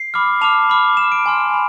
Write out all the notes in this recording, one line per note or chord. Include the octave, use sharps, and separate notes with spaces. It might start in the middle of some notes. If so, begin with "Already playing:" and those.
Already playing: C7
B5 D6 F6
A5 D6 F6 F7
B5 D6 F6
A5 D6 F6 E7
D7
G#5 C6 F6
B5